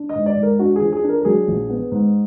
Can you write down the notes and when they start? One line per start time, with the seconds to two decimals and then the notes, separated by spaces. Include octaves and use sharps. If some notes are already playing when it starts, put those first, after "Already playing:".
Already playing: D4
0.09 D#5
0.15 G#2
0.26 D5
0.37 G#2
0.43 A#4
0.59 D4 F#4
0.76 G#4
0.81 F3
0.93 G#4
1.03 D4
1.09 A#4
1.21 A#4
1.25 F#3 G#4
1.48 A#1
1.69 B3
1.92 G#2